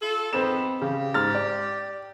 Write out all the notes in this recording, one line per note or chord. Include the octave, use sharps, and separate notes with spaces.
F4 A4
F2 G#2 B3 C4 E7
C#3 G4
G#2 F6 A6
D5